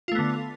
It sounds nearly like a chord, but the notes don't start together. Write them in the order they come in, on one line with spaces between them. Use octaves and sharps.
F4 A3 B3 D3